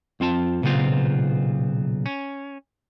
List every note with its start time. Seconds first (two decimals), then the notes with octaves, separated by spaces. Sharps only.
0.20 F2 C4 F4 A5
0.62 B1 A#2 C#3 B3 C4 F4
2.06 C#4